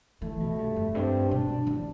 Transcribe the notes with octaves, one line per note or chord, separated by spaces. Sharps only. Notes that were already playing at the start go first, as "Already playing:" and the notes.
E3 A3
B2
G2
F2
G2 C4
B2 D4
E3